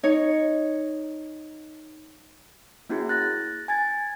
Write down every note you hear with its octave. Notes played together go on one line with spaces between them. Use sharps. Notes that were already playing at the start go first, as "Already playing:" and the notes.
D#4 C#5
A#3 C#4 E4 F#4 G#4
F#6 A6 A#6
G#5 G#6 A6